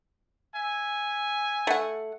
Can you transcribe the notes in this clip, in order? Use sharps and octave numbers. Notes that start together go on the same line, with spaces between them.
E5 G#5
A3 F#5